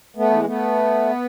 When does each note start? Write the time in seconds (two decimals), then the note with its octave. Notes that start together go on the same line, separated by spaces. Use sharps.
0.16 A3 B3
0.31 E3 G#3
0.44 A3 B3